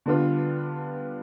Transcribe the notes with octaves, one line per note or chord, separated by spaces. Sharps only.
D3 G3 B3 D4 F4